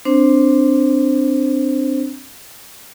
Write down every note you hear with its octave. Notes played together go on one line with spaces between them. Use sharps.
C4 D4 C5